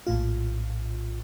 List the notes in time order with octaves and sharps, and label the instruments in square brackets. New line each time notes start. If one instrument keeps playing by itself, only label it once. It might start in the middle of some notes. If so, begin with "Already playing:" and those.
[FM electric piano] A#1 A2 F4